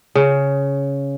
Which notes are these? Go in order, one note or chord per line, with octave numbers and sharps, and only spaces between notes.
C#3